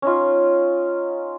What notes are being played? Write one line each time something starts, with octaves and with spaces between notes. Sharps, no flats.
C#4 D#4 F4